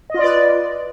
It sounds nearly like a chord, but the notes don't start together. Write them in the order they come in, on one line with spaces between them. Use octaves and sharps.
D#5 F4 D5 B4